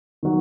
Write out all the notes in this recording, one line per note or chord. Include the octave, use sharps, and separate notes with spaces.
D#3 F#3